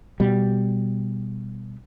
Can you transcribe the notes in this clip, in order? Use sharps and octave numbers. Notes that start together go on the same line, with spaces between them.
B2 G3